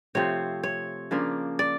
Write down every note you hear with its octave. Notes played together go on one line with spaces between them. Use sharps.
C3 F3 A3 C4 C#5
C#5
C#3 F3 A#3 D4
D5